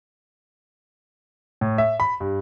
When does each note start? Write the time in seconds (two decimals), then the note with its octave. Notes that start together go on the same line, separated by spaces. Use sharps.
1.61 A2
1.78 E5
2.00 B5
2.20 G2